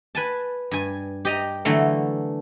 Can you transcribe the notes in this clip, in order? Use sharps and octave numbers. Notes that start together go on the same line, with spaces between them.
B4 G#5 A5
G2 G#5
G4 D#5 A#5
D3 E3 F#3 A3